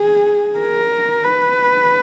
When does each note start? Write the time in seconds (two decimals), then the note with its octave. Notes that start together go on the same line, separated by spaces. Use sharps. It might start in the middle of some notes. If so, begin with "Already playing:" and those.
Already playing: G#4
0.59 A#4
1.24 B4